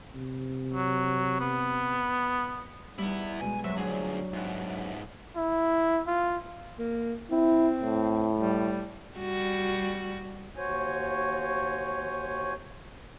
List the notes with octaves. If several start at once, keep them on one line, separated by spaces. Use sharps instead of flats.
C3
F#3
B3
G3 B3 D#4 E4
B2 G#3 G#5
F#3 C5 E5
D2 D4 G#4
G#2 B3 E5 G5 F#6
E4
F4
A#3
C4 E4
A2
G3
G3 F#4
D#2 F#4 C5 C#5 G#5